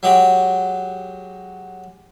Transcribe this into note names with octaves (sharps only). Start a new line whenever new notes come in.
F#3 G#3 G4